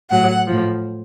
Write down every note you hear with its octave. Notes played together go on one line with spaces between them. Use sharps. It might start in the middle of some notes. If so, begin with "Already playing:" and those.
A2 F#3 F#5
A2 F3